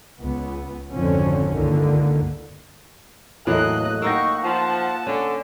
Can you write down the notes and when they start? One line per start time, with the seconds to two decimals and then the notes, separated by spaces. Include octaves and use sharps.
0.19 C#2 B3
0.91 G#1 F2 D3 F3 C4 C#4
1.52 C#2 G2 D3 D#3 A#3
3.47 E2 A2 E3 F#3 A#3 A4 D#5 F#6
4.02 A#3 D#4 F#5 G5 C#6 E6 A#6
4.43 F3 F#5 A5
5.07 D3 C#4